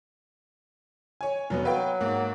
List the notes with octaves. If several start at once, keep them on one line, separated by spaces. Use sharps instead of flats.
C#5 G#5
F1 F#3 B3
F#3 B4 F5 G5
G#2 A#3